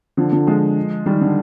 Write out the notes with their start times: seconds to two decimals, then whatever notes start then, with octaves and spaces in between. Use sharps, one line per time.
0.17 D3 F3
0.32 D3 F3
0.47 F3 G#3
1.06 D#3 G3
1.21 D3